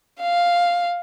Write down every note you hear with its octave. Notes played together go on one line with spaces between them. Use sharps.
F5